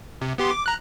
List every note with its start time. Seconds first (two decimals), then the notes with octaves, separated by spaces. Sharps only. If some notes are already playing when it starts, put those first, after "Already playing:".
0.21 C3
0.38 B3 G4 C6
0.51 D6
0.66 A#5 F#6